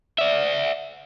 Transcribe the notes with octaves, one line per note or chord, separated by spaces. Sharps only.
D5 E5